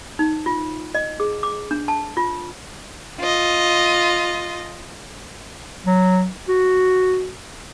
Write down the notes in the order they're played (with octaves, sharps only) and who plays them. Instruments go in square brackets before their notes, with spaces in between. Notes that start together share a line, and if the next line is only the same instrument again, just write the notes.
[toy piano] D#4
F4
D#5
G#4
D6
D4
A5
F4
[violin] F4 D#5
[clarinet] F#3
F#4